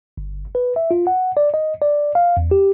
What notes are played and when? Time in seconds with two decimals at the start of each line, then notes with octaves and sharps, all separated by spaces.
0.18 G1
0.55 B4
0.76 E5
0.91 F4
1.07 F#5
1.37 D5
1.54 D#5
1.82 D5
2.15 F5
2.37 E2
2.51 G4